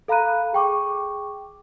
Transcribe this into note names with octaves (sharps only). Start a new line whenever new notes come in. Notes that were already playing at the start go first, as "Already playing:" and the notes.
A4 F5 A#5 B5 F#6 D#7
G#4 G5 C#6 D6